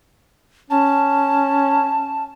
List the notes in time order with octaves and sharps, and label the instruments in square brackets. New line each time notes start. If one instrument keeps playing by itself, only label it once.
[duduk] C#4 [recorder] A5